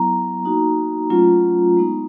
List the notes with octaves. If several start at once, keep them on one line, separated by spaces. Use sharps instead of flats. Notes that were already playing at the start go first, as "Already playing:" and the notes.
Already playing: F#3 B3 E4 A#5
A#3 D#4 F#4
F#3 A3 C#4 F4
G#3 B3 D#4